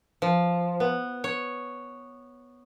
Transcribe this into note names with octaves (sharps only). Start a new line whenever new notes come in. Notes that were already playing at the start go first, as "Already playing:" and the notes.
F3
B3
C#5